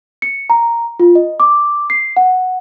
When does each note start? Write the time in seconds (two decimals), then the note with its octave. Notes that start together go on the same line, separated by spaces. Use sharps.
0.22 C#7
0.50 A#5
1.00 F4
1.15 D#5
1.40 D6
1.90 C7
2.17 F#5